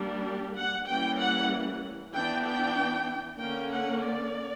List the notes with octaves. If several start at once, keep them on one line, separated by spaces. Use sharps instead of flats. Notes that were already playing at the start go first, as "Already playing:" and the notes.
Already playing: G3 A#3 D4
G4
F#5
E3 G3 A#3 C#4 G5
F#5
E3 B3 D4 G5
G5
D3 A#3 C#4 G5
F#5
D5